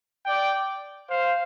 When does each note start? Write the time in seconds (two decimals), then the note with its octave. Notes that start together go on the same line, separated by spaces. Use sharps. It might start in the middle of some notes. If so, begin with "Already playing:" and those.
0.25 D5 G5
1.08 C5 F5